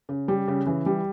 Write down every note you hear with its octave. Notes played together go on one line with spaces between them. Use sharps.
C#3
G3
C#3
E3
G3